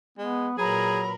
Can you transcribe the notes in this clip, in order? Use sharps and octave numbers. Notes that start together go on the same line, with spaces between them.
G#3 B3
A#2 F#3 G#4 A#4 B4 A#5 B5